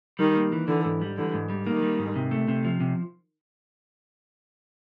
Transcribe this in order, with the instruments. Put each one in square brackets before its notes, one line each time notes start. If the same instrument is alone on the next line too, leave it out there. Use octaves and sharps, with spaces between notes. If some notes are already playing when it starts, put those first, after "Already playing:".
[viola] D#3 [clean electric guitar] G3
[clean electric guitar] A#3
E3
[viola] D3 [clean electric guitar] E3
[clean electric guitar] G#2
G3
[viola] D3 [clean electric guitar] E3
[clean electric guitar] G#2
G3
[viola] D#3 [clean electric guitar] A#3
[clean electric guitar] G3
G#2
C3
A3
C3
F3
C3